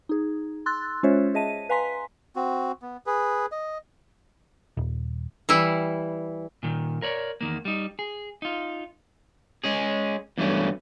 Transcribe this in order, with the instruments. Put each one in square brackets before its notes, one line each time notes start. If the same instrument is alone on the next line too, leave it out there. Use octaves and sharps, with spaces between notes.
[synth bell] D#4 G#4
C6 E6 F#6 A6
G#3 C#4 F4 C5 C#5 E5
G#4 D#5 E5 A5 D#7
B4 F5 G#5 A#5 C6 B6
[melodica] C4 F#4
B3
G#4 B4
D#5
[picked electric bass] D#1
[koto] E3 G3 E4
[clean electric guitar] A#2 D#3
A#4 C#5 D5
E2 D#3 A#3
G3 D#4
G#4
D#4 F4
G#3 C#4 G#4
E2 G2 E3 F#3 A3 C#4